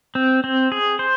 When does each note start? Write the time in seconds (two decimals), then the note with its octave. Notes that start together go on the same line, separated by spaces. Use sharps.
0.15 C4
0.44 C4
0.72 G#4
0.99 C5